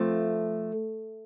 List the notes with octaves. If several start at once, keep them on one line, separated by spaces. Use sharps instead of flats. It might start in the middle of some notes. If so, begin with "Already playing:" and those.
Already playing: F3 A3 C4 F4